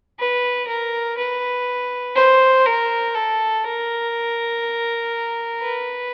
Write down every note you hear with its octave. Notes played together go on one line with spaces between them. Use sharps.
B4
A#4
B4
C5
A#4
A4
A#4
B4